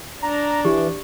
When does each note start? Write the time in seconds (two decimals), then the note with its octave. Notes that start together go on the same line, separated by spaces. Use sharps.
0.22 D4 A#5
0.65 E3 G4